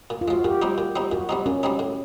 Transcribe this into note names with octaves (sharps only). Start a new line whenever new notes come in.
A#2
F4
F3 G#3 F#4
A#2 G4
G3 C4 D#4
A#2
G3 C4 D#4
A#2 F#4
G3 C4 D#4
A#2 C#4
G3 C4 D#4
A2